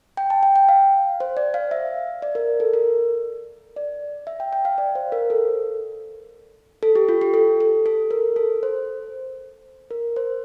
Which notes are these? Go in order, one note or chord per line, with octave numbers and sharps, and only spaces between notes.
G5
A5
G5
G5
F5
C5
D5
F5
E5
D5
A#4
A4
A#4
D5
E5
G5
G5
F5
D5
C5
A#4
A4
A4
G4
F4
G4
A4
A4
A4
A#4
A4
C5
A#4
C5